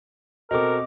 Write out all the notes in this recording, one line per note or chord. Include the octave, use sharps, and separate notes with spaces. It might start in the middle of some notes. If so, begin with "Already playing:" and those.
B2 C4 A4 A#4 D#5 D6